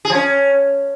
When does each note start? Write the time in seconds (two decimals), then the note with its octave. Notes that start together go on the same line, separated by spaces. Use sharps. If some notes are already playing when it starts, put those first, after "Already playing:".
0.05 G#4
0.10 F3
0.15 C#4